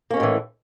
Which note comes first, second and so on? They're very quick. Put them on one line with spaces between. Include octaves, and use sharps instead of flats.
A#3 C#4 G#3 A2 E3